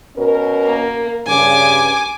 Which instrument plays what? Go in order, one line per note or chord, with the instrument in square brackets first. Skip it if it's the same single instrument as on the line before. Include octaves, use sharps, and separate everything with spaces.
[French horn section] B2 C#4 A#4
[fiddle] A#3
[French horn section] G2 C#3 [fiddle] G#5 D6